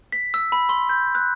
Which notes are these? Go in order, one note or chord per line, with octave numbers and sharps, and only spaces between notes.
B6
E6
B5
C6
G6
F#6